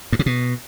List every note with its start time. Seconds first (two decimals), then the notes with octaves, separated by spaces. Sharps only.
0.12 G2
0.19 C3
0.26 B2